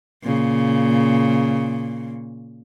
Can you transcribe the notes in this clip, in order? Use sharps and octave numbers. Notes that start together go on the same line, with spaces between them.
A#2 C#3